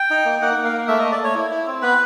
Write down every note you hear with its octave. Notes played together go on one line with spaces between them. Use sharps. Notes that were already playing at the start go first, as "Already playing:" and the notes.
Already playing: G5
D#4
A#3
A#3 F#5
A#3
F5
A#3
A3 E5
A3 D#5
D5
A3 C#5
E4
E4
C4
B3 B4